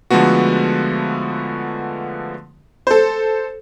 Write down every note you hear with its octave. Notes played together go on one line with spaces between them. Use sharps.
D3 F3 G#3 A3 B3 F#4
A4 C5